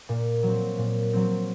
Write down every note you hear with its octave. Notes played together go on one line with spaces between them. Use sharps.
A#2
F#3 C4
A#2
F#3 C4